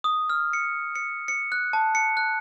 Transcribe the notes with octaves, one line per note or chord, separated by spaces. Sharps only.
D#6
F6
C#7
C#7
C#7
F#6
A5
C#7
F#6